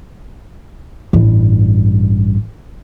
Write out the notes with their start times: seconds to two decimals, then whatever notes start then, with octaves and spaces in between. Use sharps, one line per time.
1.13 A1 G2